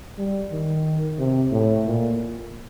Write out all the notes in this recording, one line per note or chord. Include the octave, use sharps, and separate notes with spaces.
G3
D#3
C3
A2
A#2